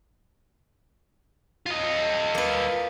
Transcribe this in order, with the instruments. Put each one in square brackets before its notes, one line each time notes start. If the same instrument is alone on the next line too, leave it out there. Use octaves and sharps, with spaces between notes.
[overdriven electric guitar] F4 D#5
[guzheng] A#3 B4